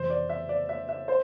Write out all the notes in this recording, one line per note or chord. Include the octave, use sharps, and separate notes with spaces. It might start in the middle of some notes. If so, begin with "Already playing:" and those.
Already playing: F2 C3 E3 C5
D5
E5
D5
E5
E5
C5